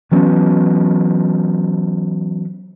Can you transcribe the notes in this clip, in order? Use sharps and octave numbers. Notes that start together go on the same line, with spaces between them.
E3 F#3 B3 C#4